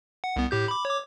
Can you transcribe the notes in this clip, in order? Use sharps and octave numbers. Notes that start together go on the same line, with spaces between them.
F#5
C2 B3
A2 G4 G6
B5 D6
C#5 D6